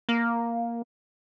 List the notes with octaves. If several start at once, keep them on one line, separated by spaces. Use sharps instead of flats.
A#3